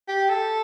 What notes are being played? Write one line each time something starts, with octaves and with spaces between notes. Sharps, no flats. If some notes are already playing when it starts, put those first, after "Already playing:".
G4
A4